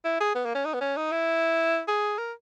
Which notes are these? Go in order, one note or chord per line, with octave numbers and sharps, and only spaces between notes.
E4
G#4
B3
A#3
C#4
D#4
B3
C#4
D#4
E4
G#4
A#4